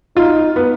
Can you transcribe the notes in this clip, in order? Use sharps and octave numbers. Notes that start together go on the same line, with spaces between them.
D#4 F4
B3